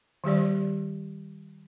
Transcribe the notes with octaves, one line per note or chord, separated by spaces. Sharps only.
D#3 G3 G4 D5